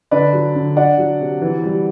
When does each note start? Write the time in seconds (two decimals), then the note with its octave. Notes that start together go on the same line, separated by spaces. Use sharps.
0.11 D3 B4 D5
0.33 F#3
0.56 D3
0.76 D4 D5 F#5
0.98 F#3
1.21 C3
1.42 E3
1.64 G3